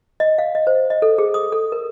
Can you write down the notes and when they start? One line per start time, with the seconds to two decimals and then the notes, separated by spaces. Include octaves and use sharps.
0.20 D#5
0.38 F5
0.55 D#5
0.67 C5
0.90 D#5
1.02 A4
1.18 G#4
1.34 D#6
1.52 A4
1.72 A#4